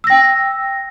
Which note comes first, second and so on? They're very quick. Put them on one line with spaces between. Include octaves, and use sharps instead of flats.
E6 A#6 G5